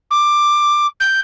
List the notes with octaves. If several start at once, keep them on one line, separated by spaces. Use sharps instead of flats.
D6
G6